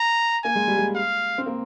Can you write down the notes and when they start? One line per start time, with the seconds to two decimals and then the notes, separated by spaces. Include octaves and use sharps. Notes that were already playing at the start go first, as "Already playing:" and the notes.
Already playing: A#5
0.44 A#3 G#5
0.55 G#3
0.67 G3
0.78 G#3
0.95 F5
1.38 C4
1.46 A#3